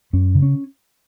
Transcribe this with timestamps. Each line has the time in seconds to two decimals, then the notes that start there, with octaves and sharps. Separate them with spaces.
0.13 F#2 C#4
0.35 C#3
0.42 C#4